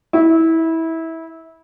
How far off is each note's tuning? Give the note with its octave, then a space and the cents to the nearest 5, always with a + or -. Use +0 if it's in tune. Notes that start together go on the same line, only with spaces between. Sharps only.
E4 -20